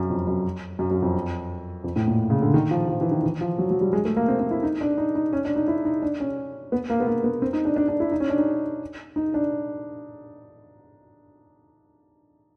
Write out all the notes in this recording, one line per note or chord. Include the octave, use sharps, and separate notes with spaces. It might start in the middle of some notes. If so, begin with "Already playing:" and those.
Already playing: F#2
F2
F#2
F#2
F#2
F2
F2
A2
A#2
C#3
D3
D#3
F3
F3
E3
D#3
E3
F3
F#3
F#3
G3
G#3
A3
A#3
C4
C4
E4
D#4
D4
D#4
D#4
C#4
D4
D#4
E4
D#4
D4
C#4
B3
A#3
B3
A#3
B3
C4
D#4
D4
D4
D4
E4
D#4
C#4
D4
D#4
D#4
D4